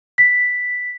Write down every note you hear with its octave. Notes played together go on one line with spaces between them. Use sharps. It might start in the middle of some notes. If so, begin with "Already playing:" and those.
B6